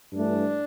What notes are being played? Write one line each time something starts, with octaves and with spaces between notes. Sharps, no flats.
G2 E3 A3 D4